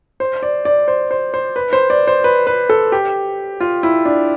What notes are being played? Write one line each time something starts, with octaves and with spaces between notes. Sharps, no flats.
C5
D5
D5
C5
C5
C5
B4
C5
D5
C5
B4
B4
A4
G4
F4
E4
D4